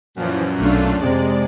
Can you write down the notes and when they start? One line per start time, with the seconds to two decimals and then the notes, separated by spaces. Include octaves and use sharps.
0.17 F#2 A#2 E3 F3
0.58 B1 A3 D4 F4
0.98 F2 C3 G#3 D5